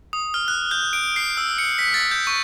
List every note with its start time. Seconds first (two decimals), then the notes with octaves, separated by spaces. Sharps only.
0.13 D#6
0.34 F6
0.48 F#6
0.71 G6
0.93 D7
1.16 C7
1.37 E6
1.58 C#7
1.79 B6
1.94 A6
2.11 G6
2.27 C#6